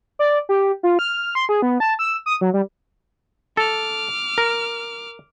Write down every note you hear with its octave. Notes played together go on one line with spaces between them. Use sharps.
D5
G4
F4
F6
C6
G#4
B3
A5
E6
D#6
F#3
G3
A4 D6 F6
A#4